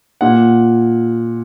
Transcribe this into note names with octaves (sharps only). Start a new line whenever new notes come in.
A#2 F#5